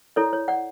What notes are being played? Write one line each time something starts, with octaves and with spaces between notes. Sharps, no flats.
E4 A4 C#5 D5
C#5
D5 F#5